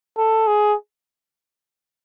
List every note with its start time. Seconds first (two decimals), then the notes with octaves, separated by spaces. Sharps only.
0.18 A4
0.47 G#4